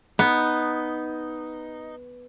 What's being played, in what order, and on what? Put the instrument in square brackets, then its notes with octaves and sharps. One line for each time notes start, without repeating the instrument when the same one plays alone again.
[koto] B3 [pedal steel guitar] D#4